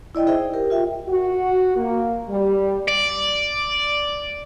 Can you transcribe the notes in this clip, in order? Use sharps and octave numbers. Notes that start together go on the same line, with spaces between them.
E4 D5 D#5 G5
D#4 G#4 C5 D#5 E5 G5
G4 A#4
F4 E5 G5
F#4
A#3
G3
D5